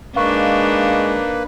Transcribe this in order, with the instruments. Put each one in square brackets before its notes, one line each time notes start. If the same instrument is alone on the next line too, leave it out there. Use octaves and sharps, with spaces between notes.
[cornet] G#3 [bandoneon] A#3 B4 [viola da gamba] D4 D#4 [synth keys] F5 C#6